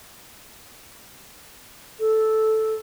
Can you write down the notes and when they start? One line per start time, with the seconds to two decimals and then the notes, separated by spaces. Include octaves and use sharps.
1.99 A4